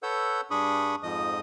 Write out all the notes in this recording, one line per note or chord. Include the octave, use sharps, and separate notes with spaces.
A4 B4 C#5 F#5 E6 G6
G2 D4 G#4 B5 C#6 D#6
F2 G#2 F3 D#5 D#6